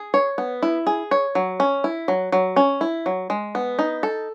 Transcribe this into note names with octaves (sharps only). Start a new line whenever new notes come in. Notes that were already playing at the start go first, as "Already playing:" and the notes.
Already playing: G#4
C#5
B3
E4
G#4
C#5
F#3
C#4
E4
F#3
F#3
C#4
E4
F#3
G#3
B3
D#4
A4